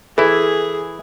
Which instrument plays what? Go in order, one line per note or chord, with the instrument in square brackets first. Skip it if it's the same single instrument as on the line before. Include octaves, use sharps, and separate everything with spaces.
[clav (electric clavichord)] E3 E4 [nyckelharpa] G#4 [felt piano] A4